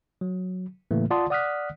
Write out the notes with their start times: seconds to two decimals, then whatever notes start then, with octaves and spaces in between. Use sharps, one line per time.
0.21 F#3
0.91 A2 C#3 E3 A3 A#3
1.11 F4 D5 F#5 A5 C6 D#6
1.30 D5 F#5 D#6 F6 F#6 B6